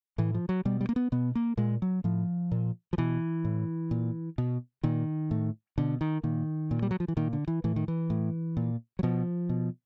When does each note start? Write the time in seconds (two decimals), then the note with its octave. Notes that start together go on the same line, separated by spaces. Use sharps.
0.18 A2 E3
0.34 F3
0.49 F#3
0.65 B2 G3
0.81 G3
0.89 A#3
0.96 B3
1.12 B2 B3
1.35 A#3
1.57 A#2 G#3
1.82 F#3
2.04 A2 F3
2.52 A#2
2.93 F3
2.98 B2 E3
3.45 A2
3.91 A#2
4.38 B2
4.83 A#2 D#3
5.31 A2
5.78 B2 D3
6.01 D#3
6.23 A#2 D#3
6.71 A#2
6.82 G3
6.91 F#3
7.00 F3
7.08 E3
7.17 A#2 D#3
7.33 D3
7.48 E3
7.64 A2 E3
7.76 D#3
7.88 E3
8.10 A2
8.57 A#2
8.99 F#3
9.03 B2 F3
9.49 B2